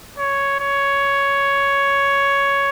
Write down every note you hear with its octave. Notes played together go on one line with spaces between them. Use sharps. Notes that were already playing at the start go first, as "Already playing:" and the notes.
C#5
C#5